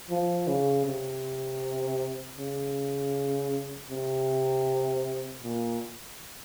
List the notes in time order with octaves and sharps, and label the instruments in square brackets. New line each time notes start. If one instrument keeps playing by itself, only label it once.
[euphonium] F3
C#3
C3
C#3
C3
A#2